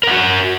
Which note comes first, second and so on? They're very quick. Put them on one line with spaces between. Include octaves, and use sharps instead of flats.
A#4 F#5 F#4